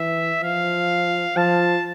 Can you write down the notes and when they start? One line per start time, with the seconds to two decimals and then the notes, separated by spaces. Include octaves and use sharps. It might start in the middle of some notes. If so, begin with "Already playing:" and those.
Already playing: E3 E5
0.42 F3 F5
1.36 F3 A5